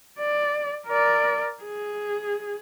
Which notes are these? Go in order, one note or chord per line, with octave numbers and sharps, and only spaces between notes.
D5
A#4 D5
G#4